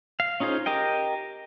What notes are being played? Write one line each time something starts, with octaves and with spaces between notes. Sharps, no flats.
F5
C#4 D#4 F4 G#4 C5
G4 A#4 D#5 G5